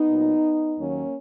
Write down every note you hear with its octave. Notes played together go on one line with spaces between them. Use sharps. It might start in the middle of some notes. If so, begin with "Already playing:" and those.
Already playing: B3 D#4
A#2 F#3
D#2 D#3 F#3 A#3 C#4